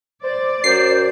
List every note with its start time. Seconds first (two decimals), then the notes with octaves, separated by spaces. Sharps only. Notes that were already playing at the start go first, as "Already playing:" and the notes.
0.23 C5 D5
0.64 F#2 C5 C7